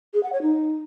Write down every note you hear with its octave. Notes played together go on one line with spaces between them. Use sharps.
G#4
F#5
C#5
D#4